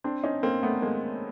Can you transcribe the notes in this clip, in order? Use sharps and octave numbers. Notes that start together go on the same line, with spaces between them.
C4 D4
C#4 D#4
A#3 C4
A3 B3
G#3 A#3